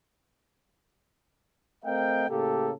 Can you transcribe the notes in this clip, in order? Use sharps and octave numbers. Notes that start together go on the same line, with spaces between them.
A3 C4 A#4 D#5 F5 G5
A2 C#3 A#3 G4 A4